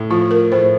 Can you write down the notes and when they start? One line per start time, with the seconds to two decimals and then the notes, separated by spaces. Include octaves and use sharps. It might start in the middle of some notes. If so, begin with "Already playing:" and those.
Already playing: A2
0.10 F3 F4
0.31 A#4
0.52 A2 C5